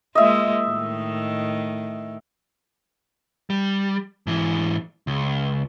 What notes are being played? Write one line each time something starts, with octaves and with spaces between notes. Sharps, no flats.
G#3 A#3 F4 D#5 E5
A2 D#3
G3
G#2 E3
C#2